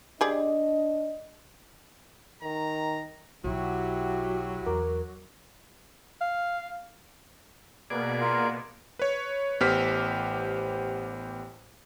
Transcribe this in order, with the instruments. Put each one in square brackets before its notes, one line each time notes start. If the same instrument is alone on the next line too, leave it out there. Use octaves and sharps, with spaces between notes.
[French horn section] D4 D#5 [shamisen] G4 G#4 D5
[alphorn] D#3 [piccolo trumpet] A#5
[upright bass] B1 [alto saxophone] F#3 [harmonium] E4 F#4 G4
[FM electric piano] E2 A#4 D6
[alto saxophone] F5
[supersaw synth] B2 A#3 B3 [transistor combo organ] G#4 D5
[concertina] F4 A#4
[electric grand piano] B4 C#5
A1 B3 G4 C5 F6 B6